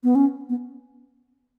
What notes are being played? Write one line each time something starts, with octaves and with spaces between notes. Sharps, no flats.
B3
C#4
B3